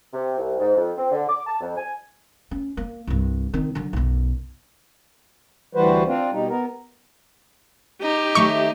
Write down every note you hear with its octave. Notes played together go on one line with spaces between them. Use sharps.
C3
C2
G#2
F2
C4
D3
D6
A5
F2
G#5
C#4
A#3
C2 G2
D#3 C4
D3 F#3
B1 F#2
D2 E3 G3 F#4 B4 C5
C4 D4 F4
B2 G3 D#4
B3 A#4
D#4 G4
D#2 A3 E5 C#6